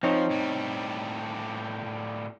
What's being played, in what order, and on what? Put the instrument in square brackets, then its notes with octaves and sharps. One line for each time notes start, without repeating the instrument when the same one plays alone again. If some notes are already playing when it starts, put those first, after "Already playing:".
[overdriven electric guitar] F3 [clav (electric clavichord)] C4 D#4 C#5
[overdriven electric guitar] A2 G3